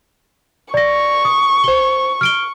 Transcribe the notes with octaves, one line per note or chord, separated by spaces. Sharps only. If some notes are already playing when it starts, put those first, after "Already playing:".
D5 C#6 A#6
D#6
C5 G7
F6 D7 G7